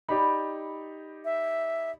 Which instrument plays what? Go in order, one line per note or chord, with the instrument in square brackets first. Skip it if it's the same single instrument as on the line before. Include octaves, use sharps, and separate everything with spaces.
[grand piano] D#4 G4 D5 [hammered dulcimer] B5
[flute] E5